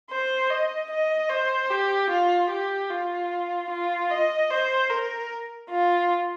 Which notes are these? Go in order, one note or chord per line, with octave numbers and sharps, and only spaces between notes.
C5
D#5
D#5
C5
G4
F4
G4
F4
F4
D#5
C5
A#4
F4